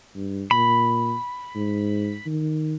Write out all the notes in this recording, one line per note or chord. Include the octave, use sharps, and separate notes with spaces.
G2
A#2 B5
G#2
D#3